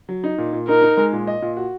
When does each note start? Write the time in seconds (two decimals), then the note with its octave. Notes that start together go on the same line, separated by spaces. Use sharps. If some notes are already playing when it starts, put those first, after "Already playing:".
0.09 F#3
0.24 D#4
0.38 A#2
0.53 A#2
0.68 D#4 A#4
0.82 D#4
0.97 G#3
1.13 A#2
1.27 D#5
1.42 A#2
1.57 F#4